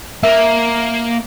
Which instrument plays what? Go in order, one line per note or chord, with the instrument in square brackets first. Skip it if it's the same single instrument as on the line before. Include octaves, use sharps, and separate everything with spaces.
[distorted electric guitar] A#3 [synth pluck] E5